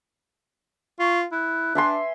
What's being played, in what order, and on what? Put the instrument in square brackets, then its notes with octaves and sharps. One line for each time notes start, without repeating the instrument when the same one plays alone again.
[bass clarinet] F4 [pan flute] C#6
[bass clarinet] E4 [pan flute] F#6
[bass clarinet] D4 [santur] E5 G#5 C6